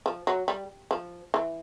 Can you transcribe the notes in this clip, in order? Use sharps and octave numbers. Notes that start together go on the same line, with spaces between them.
F3
F#3
G3
F3
E3